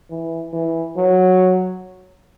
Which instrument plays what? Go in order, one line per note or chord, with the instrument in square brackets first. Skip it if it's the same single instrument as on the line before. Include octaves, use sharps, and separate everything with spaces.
[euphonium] E3
E3
F#3